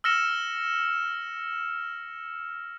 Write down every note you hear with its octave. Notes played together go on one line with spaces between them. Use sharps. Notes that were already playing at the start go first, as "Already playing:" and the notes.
E6 F6 A#6 C#7 E7